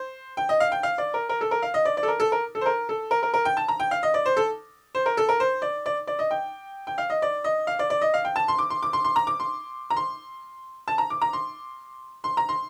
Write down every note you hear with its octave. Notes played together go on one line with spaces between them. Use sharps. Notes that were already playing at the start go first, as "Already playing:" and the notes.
Already playing: C5
G5
D#5
F5
G5
F5
D5
A#4
A#4
A4
A#4
F5
D#5
D5
D5
A4
A#4
A4
A#4
A4
C5
A#4
A4
A#4
A#4
A#4
G5
A5
A#5
G5
F5
D#5
D5
C5
A4
C5
A#4
A4
A#4
C5
D5
D5
D5
D#5
G5
G5
F5
D#5
D5
D#5
F5
D5
D5
D#5
F5
G5
A5
C6
D6
C6
D6
C6
C6
A#5
D6
C6
A#5
C6
A5
A#5
D6
A#5
C6
C6
A#5
C6